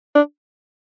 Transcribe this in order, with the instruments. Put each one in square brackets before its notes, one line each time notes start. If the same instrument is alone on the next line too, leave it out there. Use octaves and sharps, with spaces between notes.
[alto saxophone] D4